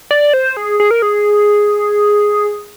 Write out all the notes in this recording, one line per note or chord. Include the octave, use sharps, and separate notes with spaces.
D5
C5
G#4
G#4
A#4
G#4